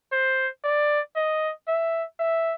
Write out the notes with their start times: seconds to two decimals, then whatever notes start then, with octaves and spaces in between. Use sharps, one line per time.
0.12 C5
0.64 D5
1.16 D#5
1.68 E5
2.20 E5